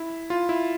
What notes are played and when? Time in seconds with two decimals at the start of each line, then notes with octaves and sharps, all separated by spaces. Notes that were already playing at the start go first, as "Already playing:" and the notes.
Already playing: E4
0.30 F4
0.49 E4